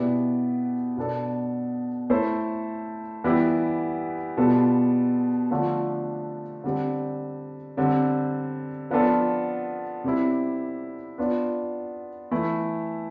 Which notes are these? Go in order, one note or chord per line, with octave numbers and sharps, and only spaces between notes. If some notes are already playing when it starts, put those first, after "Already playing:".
Already playing: B2 B3 E4 G4 D5
B2 B3 D4 A4
A3 E4 A4 C5
E3 G3 B3 E4 G4
B2 G3 B3 F4 A4
D3 F3 A3 D4 F4
D3 G3 C4
D3 G3 C4
F3 B3 D4 F4 A4
C3 G3 C4 E4
B3 D4 F4
E3 A3 E4